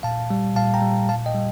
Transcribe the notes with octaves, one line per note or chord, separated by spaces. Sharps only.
A#2 F5 A5
G3
A#2 F5 A5
G5 A#5
G3
A#2 F5 A5
D#5 G5
G3